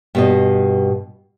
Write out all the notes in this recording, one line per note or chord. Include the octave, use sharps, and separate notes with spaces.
G2 B2 D#5